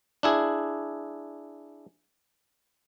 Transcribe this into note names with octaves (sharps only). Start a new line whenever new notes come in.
D4 E4 G#4